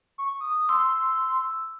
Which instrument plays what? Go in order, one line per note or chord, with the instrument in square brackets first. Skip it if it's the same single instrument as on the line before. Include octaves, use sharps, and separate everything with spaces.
[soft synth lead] C#6
D#6
[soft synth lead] C6 [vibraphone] E6